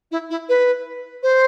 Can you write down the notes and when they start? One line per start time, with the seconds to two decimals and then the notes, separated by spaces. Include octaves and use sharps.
0.11 E4
0.30 E4
0.49 B4
1.23 C5